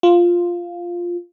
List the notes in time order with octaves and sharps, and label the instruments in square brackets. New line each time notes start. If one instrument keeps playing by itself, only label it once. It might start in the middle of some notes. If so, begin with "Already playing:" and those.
[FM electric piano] F4